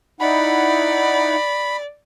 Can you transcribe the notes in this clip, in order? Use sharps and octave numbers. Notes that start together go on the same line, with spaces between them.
D#4 E4 D5 F#5 B5